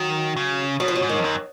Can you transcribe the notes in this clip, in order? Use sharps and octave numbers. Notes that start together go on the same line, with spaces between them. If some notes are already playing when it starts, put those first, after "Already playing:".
Already playing: D#3 F#3
C#3
B2 F#3
F3
F#3
G#2
D#3
F2
F#2